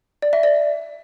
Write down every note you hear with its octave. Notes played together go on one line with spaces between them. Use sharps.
D5
E5
D5